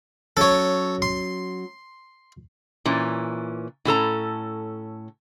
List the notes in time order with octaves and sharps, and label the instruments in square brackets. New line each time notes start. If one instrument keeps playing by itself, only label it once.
[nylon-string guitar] F#3 C#4 [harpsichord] A4 C#5
[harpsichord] C6
[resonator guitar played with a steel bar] A#2 E3 C#4
A2 C#4 A4 A#5